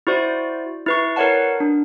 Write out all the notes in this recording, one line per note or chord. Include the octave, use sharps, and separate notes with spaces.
E4 F#4 C5 D5
E4 B4 C#6
A#4 B4 C#5 D5 F#5 A5
D4